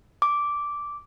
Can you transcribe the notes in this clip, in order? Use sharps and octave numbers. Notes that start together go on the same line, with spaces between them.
D6